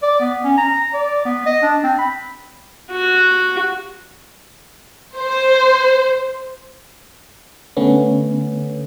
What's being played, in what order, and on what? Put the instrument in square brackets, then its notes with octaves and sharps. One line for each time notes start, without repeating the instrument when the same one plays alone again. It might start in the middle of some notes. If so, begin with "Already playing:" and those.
[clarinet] D5
B3
C#4
A#5
D5
B3
D#5
D4
C4
B5
[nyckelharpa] F#4
[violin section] C5
[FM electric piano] D3 A3 B3 C#4